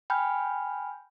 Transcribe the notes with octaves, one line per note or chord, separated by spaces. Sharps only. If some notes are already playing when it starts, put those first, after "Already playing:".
G5 G#5 B5 F6 G6